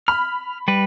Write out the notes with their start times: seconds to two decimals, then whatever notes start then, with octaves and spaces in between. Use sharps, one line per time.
0.08 B5 F6
0.68 G3 B4